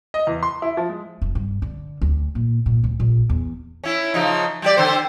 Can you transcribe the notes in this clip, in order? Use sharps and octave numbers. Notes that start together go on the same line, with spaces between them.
D#5
E2
C6
E4
F3
G#3
F1
G2
D3
D2
A#2
A#2
D2
A#1
E2
C#4 E4
C#3 F3 D#4
G3 G4 D5
D3 C4 C5